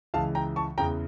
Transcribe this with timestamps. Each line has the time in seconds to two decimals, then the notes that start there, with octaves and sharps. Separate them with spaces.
0.14 C#2 C#3 E3 F5 A5
0.35 G5 A#5
0.56 A5 C#6
0.78 E2 C#3 E3 G5 A#5